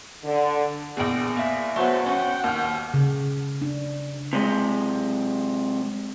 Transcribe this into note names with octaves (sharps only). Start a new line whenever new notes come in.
D3
A#1 E2 G#4 G5
A#3 E5
F#3 A3 B3 C5
C#4 F#5 G5
D#2 F6
C#3
D4
C3 G#3